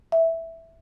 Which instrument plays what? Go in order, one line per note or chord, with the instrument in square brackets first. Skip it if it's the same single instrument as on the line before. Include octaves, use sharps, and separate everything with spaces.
[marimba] E5